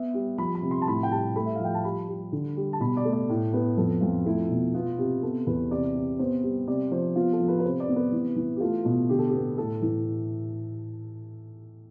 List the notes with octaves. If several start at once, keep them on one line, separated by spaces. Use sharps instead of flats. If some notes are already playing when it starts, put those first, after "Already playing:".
Already playing: B3 E5
G3
F3 B5
B5
C3
C6
A5
A2 B5
G5
G3 A5
A3 B5
E5
F3 F5
G5
A5
G3 B5
G3
D3
G3
A5
B2 B5
D5
A3
D5
A2
B3 B4
F2 A4
F2 F4
A3 E4
B2
B3 F4
C3 G4
B3 A4
E2 B4
C3 D5
C3
B3 C5
G3
C3 D5
F3 C5
B3 F4
A4
F3
B4
B4
C3 C5
D5
B3
B4
E3
E3
G4
A3 F4
B2
D3 G4
A4
B3 G4
A2 A4
E3